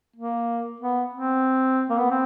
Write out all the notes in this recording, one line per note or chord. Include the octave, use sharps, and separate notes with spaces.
A#3
B3
C4
A#3
B3
C4